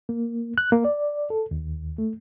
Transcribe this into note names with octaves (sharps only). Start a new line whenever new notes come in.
A#3
F#6
A#3
D5
A4
D#2
A3